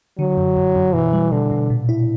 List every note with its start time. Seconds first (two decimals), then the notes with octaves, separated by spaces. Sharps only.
0.19 D3 F#3
0.38 F#2
0.57 F#2
0.76 F#2
0.94 B2 E3
1.13 G3
1.32 B2 D3
1.51 B2
1.70 A#2
1.89 E4